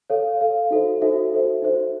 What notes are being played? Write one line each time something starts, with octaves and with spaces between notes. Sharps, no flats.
A4 C#5 F5
A4 C#5 F5
D#4 F#4 A4 C5 E5
D#4 F#4 A4 C5 E5
D#4 F#4 A4 C5 E5
D#4 F#4 A4 C5 E5